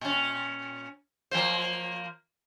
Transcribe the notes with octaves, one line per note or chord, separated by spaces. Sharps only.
A#2 C#4
F3 A#3 C5